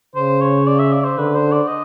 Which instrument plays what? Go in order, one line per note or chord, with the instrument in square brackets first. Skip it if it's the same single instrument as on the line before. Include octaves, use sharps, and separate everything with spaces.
[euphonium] C#3 [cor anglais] C5
[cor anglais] C#5
D5
E5
D5
C5
[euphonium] D3 [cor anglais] B4
[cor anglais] C5
D5
D#5